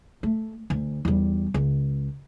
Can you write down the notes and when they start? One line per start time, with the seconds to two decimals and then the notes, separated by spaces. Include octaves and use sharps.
0.23 A3
0.70 D2
1.05 E2 G3
1.54 C#2